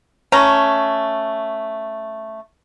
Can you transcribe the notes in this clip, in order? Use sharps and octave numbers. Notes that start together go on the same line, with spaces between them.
A3 C#4 A#5